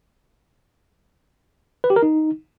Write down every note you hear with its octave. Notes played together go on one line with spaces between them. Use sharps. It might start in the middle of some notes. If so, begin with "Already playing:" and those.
B4
G4
A#4
D#4